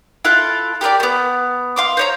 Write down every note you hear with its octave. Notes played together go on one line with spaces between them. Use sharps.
E4 F4 A4 F#6
G4 A#4 B4 D5
A3 B3
F5 C6 D6
C5 C#5 A#5